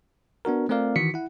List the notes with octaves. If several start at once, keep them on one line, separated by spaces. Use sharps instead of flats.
B3 D4 F#4 A#4
A3 C4 F4 A#4 D5 F5
D#3 E3 F#4 B6 C#7
E4 F#5